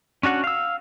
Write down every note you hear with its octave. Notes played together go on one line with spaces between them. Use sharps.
C#4 D4 F#4 F#5
F5 E6